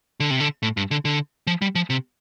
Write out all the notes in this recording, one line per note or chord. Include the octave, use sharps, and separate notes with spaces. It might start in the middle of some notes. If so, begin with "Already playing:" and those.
D3
C3
D3
A2
G2
D3
D3
F3
G3
F3
C3